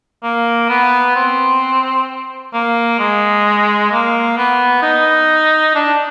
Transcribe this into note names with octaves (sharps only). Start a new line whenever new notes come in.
A#3
B3
C4
A#3
G#3
A#3
B3
D#4
D4